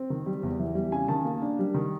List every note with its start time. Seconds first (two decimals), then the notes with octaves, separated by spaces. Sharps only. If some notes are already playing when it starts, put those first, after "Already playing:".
Already playing: C4
0.10 D#3
0.26 G3
0.43 E2
0.59 E3
0.75 G3
0.92 C#3 G#5
1.08 D#3 A5
1.25 A#3
1.42 D4
1.59 G3
1.74 D#3